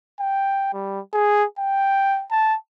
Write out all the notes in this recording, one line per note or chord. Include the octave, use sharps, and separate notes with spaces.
G5
G3
G#4
G5
A5